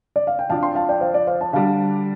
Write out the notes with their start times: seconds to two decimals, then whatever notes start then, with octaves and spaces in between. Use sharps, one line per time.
0.16 D5
0.27 F5
0.39 G5
0.50 F2 F3 D4 F4 F5 A5
0.63 G5 C6
0.75 F5 A5
0.89 D5 G5
1.01 C5 F5
1.14 D5
1.27 C5 F5
1.41 F5 A5
1.53 D3 G3 D4 F5 A5